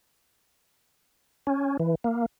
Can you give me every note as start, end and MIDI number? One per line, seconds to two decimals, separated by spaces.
1.47 1.77 61
1.80 1.95 52
2.04 2.26 58